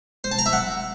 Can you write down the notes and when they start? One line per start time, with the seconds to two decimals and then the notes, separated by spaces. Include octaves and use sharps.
0.24 C5
0.32 A5
0.39 A#5
0.46 E5
0.53 F#5